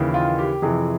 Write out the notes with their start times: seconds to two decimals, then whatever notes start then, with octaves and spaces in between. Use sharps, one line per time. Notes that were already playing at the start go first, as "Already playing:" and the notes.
Already playing: D#2 C#3 E3
0.08 E4
0.14 F4
0.38 G4
0.62 F2 C3 E3 G#4